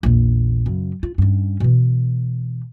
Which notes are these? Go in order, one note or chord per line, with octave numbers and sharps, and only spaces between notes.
A#1 E2
F#2 C#3
F4
G2 C#4
B2 E3